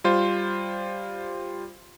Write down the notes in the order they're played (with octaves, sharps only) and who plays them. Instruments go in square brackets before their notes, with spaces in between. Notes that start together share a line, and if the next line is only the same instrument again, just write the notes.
[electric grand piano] G3 F4 C5